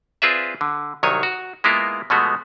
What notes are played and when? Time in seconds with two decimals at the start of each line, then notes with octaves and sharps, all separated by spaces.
0.22 C4 F4 G#4 B4 D5 E5
0.61 D3
1.03 C2 D#3 F#3 C#5 G#5
1.23 F#4
1.64 G#3 A#3 B3 E4 F4 A#4
2.10 B2 F3 G#3 A3 B3 F#4